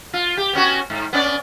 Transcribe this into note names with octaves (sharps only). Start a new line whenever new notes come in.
F4
G4
B3 C#4 F#4
G#2
B3 C#4 D5